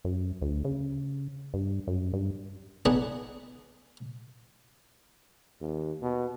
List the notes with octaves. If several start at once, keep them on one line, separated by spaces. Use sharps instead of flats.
F#2
D2
C#3
G2
F#2
G2
B3 D4 D#4 G#4 F#5
D#2
B2